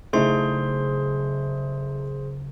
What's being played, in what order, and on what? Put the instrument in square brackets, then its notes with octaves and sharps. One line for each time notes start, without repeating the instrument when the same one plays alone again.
[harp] F#1 C#3 [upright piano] A3 D#4 E4 [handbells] G#4 C5 C6